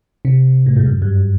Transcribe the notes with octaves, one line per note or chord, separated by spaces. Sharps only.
C3
A2
G#2
F#2
G2